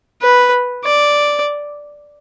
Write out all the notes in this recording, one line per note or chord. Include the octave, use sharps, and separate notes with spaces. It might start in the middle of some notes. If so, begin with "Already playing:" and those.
B4
D5